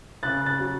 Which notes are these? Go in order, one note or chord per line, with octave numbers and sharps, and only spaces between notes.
C#3 F#6 A6
F#6 A6
F#3